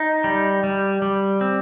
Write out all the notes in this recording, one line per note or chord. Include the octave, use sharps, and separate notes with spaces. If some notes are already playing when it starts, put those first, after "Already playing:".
Already playing: D#4
G3
G3
G3
C4